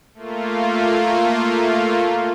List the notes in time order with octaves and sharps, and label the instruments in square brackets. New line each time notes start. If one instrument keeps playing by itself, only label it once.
[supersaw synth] A3 A#3 F4